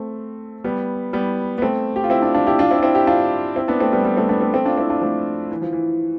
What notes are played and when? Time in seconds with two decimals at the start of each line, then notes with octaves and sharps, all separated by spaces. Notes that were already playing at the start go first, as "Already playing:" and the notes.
Already playing: A3 C4
0.64 G3 B3
1.13 G3 B3
1.58 B3
1.62 A3 C4
1.96 G4
2.04 F4
2.10 C4 E4
2.22 D4 F4
2.34 D4 F4
2.47 E4 G4
2.59 D4 F4
2.71 C4 E4
2.78 F4
2.83 C4 E4
2.95 E4 G4
3.07 D4 F4
3.56 C4 E4
3.68 B3 D4
3.80 A3 C4
3.93 G3 B3
4.05 G3 B3
4.17 A3 C4
4.29 B3 D4
4.41 A3 C4
4.53 A3 C4
4.66 D4 F4
4.78 C4 E4
4.90 D4 F4
5.02 F3 A3
5.51 E3
5.62 F3
5.73 E3